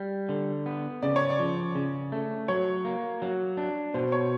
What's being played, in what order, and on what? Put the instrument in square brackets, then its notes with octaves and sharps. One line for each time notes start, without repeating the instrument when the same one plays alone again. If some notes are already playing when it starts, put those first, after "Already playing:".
Already playing: [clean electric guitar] G3
D3
B3
[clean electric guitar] C#3 [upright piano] D5
[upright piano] C#5
D5
[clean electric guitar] F3
C#3
A3
[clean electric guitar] F#3 [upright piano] C#5
[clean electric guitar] A#3
F#3
D4
[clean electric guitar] B2 [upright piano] C5
[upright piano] C#5